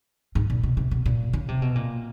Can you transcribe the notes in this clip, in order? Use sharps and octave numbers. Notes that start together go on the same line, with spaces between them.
G#2
A#2
B2
C3
B2
A#2
C#3
C3
B2
A#2